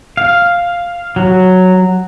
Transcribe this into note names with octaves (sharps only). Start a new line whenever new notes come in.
F5
F#3